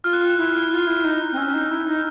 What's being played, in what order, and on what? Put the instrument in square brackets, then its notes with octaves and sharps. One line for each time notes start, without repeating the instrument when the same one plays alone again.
[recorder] F4 [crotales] F6
[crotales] F#6
F6
F#6
[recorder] E4 [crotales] F6
[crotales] F#6
F6
[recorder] F4 [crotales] F#6
[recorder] E4
D#4
C4
[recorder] C#4 [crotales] E6
[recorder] D#4
E4
D#4